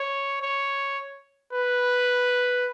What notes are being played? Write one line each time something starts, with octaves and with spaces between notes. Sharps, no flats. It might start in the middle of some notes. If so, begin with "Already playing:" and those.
Already playing: C#5
C#5
B4